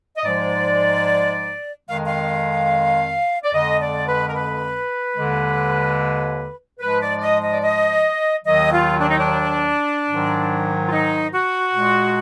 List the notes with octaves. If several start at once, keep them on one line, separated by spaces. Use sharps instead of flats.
D#5
G#2 F3 G#3 D5
F2 D#3 G#3 F5
F5
D5
F2 D3 G#3 D#5
D5
B4
A#4
B4
D#2 D3 G#3
G#2 F3 G#3 B4
D5
D5
D#5
D#5
D5
D#5
D#2 D#3 F#3 D#5
F4
D4
D#4
D4
G#2 D#3 F#3
F4
D#4
F#4
A#2 G#3